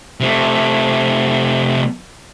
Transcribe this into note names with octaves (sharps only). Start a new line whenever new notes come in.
C3 A3